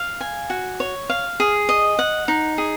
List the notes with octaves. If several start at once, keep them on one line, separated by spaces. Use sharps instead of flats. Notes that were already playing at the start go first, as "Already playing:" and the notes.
Already playing: F5
G#5
F#4
C#5
F5
G#4
D#5
F#5
D#4
G#4